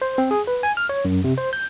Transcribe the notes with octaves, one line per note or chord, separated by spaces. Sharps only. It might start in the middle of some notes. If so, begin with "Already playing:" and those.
C5
C4
G#4
B4
G#5
F6
C#5
F#2
C3
C5
G6